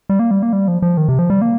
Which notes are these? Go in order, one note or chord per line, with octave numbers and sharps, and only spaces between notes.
G3
A#3
G3
A#3
G3
F3
F3
D#3
C3
F3
G3
A#3